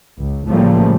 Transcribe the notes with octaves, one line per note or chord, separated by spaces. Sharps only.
C#2
A2 C#3 F3 G3 A3 A#3